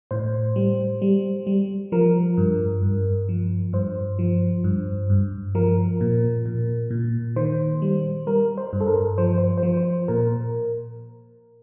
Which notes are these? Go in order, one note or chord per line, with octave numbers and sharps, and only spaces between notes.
A2 C5
G3
G3
G3
F3 A#4
G2
G2
F3
G2 C5
F3
G2
G2
F3 A#4
A#2
A#2
A#2
D#3 C5
G3
G3 A#4
C5
G2
A4
A#4
F3 C5
C5
C5
F3
C5
A#2 A#4